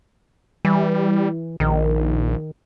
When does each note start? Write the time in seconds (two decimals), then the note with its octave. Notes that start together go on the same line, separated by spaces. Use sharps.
0.65 E3 G3
1.60 A#1 D#3